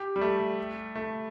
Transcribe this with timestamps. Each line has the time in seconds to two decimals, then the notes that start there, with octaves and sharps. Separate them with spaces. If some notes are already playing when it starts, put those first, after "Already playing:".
Already playing: G4
0.16 G3
0.21 A3
0.95 A3